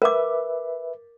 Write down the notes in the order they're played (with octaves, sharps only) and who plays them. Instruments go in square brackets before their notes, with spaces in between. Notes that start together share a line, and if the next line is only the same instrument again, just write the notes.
[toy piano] A#4 D6 [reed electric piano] B4 E5